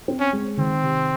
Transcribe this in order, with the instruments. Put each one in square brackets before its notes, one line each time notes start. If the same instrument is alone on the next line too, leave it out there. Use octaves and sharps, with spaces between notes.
[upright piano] C4
[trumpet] C#4
[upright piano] G#3
[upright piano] D#3 [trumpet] C4
[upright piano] C3